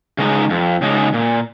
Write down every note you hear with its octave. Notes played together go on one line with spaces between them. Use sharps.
C#3 G#3 D#4
F2
C#3 G#3 D#4
A#2